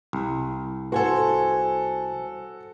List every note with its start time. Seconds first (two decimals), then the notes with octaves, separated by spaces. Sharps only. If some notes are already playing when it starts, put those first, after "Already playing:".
0.13 C2
0.92 F#4 A4 C5 G#5